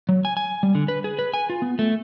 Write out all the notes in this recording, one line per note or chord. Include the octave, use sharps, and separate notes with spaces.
F#3
G#5
G#5
G3
D3
B4
G#4
B4
G#5
F4
B3
A3